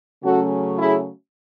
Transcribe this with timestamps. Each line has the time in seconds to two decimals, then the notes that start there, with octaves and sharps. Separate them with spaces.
0.23 C#3 F#3 A3 C#4 F#4 A4
0.77 E4 G#4